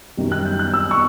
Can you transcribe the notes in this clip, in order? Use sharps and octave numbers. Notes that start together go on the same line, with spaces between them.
F#2 D#3 G3
F#6
G6
F#6
E6
C#6